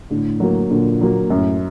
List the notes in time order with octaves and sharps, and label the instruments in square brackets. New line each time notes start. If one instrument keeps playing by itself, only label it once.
[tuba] A2 [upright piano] D3
[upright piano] F#3 A#3
[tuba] A#2 [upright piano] D3
[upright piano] F#3 A#3
[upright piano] F#2 [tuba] A2